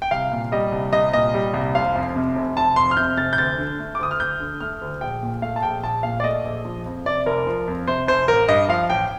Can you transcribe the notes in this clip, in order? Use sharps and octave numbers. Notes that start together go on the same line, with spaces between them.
G5
C2 F5
A#2
G3 D#5
C2
C2 D#5
A#2 D#5
G3
C2
F1 F5
F2
C3
F1
F1 A5
F2 C6
F6
C3 G6
F1 A6
G6
D2 A6
D3
A3
D6
D2 D#6
F6
D2 G6
D3
A3 F6
D2
A#1 G5
A#2
A3 F5
A5
A#1 G5
A#1 A5
A#2 F5
D5
A3 D#5
A#1
F3
F2
C3 D5
F1 A#4
F3
F2
C3 C5
F1 C5
A1 A#4
G2 D#5
F3 F5
A1 G5